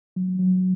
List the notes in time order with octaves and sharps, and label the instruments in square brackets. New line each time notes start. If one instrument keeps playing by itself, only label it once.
[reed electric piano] F#3
F#3